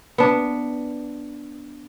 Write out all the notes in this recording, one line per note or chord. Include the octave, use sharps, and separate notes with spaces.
B3 D4